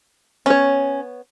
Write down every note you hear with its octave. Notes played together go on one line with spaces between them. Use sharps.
B3 C#4 C#5